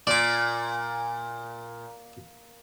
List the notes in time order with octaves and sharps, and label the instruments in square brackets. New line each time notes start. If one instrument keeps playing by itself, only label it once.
[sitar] A#2 [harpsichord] D5 D6